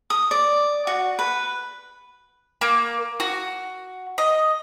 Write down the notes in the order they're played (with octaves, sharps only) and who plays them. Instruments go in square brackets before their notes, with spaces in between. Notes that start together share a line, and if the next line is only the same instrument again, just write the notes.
[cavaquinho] D#6
D5
F#4
B4
[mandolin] A#3
F#4
D#5